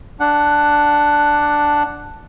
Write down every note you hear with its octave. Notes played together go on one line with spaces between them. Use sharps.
D4 F#5